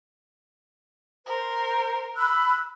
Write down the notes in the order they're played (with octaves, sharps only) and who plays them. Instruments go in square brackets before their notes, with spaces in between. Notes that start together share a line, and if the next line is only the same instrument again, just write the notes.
[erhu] A#4 [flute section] C5
[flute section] B5 E6 F#6